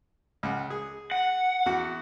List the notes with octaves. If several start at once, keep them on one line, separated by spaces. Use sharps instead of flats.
C#2 F#5
G#4
F#5
E2 F#4